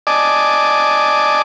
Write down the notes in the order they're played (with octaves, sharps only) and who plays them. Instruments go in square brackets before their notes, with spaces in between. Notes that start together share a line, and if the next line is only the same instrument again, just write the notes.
[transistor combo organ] D5 D#5 G#5 A5 D6